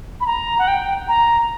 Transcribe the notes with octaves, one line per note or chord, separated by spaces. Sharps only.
B5
A#5
F#5
G5
A#5